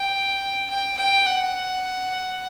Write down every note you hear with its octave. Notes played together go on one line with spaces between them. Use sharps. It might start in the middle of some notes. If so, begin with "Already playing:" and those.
Already playing: G5
G5
G5
F#5